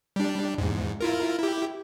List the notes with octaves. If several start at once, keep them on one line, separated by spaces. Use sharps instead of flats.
G3 D4
E2 G#2
E4 F4 A#4
E4 G4